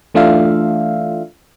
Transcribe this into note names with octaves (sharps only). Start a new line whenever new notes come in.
E3 A3 D4 F4 E5 F5